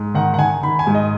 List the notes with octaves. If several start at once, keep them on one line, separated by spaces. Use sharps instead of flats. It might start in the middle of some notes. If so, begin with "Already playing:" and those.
Already playing: G#2
D#3 F#5
F#5
D#3 G#5
D#3 B5
G#5
G#2
D#5